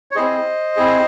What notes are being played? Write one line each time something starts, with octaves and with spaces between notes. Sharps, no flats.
C#5
C4 E4 G#4 C5 D#5
C4 E4 G#4